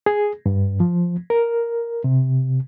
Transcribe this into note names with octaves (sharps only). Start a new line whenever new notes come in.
G#4
G2
F3
A#4
C3